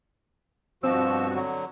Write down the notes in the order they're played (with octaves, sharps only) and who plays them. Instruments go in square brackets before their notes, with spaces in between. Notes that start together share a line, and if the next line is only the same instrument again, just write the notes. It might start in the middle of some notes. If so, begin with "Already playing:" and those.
[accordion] G2 B2 F#4 [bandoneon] F3 E6 [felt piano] C4
[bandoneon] D3 F#3